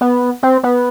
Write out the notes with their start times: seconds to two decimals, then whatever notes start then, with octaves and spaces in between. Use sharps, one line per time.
0.01 B3
0.43 C4
0.63 B3